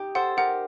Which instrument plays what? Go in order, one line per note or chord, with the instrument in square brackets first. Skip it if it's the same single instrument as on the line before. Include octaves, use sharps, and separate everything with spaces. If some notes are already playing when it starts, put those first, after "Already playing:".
Already playing: [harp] D#4 G4
[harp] A4 C5 [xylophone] F#5
[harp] G4 A#4 [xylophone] F#5